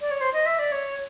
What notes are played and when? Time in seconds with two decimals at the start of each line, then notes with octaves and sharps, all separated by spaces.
0.01 D5
0.11 C#5
0.21 C5
0.33 D#5
0.46 E5
0.59 D5
0.72 C#5